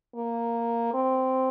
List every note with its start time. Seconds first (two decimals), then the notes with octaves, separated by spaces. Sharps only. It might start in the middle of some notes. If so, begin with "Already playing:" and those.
0.16 A#3
0.94 C4